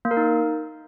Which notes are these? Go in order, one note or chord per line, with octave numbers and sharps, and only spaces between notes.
A#3
A#4
D#4